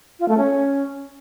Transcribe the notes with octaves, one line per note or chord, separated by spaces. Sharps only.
F4
A3
C#4